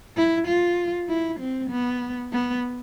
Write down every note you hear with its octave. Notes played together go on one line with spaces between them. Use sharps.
E4
F4
E4
C4
B3
B3